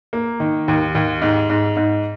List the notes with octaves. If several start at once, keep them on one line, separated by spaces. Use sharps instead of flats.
A#3
D#3
D#2
D#2
G#2
G#2
G#2